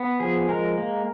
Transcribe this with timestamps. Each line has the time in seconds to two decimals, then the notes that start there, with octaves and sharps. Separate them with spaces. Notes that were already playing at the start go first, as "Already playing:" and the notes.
Already playing: B3
0.20 F3 G#4
0.48 G#3 A#4
0.77 A#3